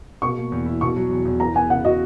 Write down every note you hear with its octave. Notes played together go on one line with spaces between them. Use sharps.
B2 C#6
A#3
E2
E4
B2 C#6
F#3
E2
E2
E3 A#5
B3 G#5
C#3 F#5
F#4 D#5